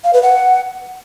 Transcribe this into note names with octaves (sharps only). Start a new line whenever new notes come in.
F5
B4
F#5